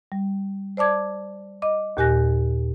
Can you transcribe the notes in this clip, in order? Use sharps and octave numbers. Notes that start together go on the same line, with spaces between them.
G3
C5 D5 A5 D6 G#6
D#5 D6
D#2 A#2 G4 G#5 F#6 A#6